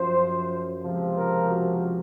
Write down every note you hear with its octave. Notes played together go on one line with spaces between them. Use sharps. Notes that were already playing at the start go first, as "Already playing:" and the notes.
Already playing: F#2 F3 C5
C#2 C3 F3
A#4
F#4